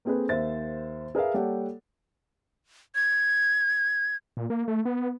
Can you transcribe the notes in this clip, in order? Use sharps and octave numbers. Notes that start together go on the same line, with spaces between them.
A#3 C4 G#4 A4 B4
D#2 C5 E5 A6
G#4 A#4 B4 E5 F5
G3 A#3 G4 A4 C#5 F#5
G#6
A#2
A#3
A3
B3